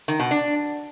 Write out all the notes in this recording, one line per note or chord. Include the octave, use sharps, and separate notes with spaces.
D#3
B2
D4